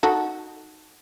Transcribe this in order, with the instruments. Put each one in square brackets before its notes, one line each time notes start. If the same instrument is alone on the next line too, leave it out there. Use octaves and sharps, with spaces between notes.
[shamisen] D#4 F#4 A4